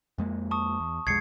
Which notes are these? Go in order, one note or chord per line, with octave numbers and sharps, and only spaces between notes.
F2 G#3 A#3
A5 C#6 D#6
E2
B1 F2 G#3 G#6 C7 C#7